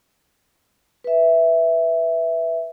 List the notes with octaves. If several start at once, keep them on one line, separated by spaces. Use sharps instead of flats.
B4 E5